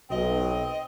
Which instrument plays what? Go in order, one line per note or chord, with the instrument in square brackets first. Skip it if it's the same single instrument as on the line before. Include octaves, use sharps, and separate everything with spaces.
[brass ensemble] B1 [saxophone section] C4 D#5